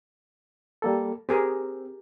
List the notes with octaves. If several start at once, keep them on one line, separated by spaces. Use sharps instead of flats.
G3 A#3 A4
C4 G4 G#4 A#4